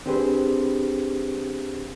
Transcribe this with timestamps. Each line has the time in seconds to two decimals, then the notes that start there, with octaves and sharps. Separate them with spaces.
0.06 C4 D4 G4 G#4 B4 C5